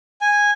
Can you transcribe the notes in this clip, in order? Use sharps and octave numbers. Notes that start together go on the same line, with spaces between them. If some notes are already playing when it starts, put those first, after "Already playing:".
G#5